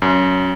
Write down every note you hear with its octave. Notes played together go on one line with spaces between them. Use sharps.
F#2